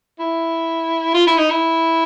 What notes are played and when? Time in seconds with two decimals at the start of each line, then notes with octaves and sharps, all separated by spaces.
0.19 E4
1.14 F4
1.27 E4
1.38 D#4
1.50 E4